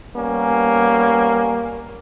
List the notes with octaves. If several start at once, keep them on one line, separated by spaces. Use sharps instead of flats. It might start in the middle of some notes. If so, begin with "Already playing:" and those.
G3 A#3 B3 C#4